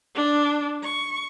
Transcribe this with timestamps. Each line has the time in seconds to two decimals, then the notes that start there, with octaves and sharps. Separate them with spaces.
0.15 D4
0.83 C#6